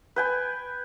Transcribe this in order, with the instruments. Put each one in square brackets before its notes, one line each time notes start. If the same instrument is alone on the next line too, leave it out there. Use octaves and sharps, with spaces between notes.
[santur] B4 G5 G#5